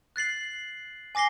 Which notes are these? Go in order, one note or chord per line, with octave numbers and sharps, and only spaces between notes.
F#6 A6 C7 F#7
G#5 D6 A#6 C7 G7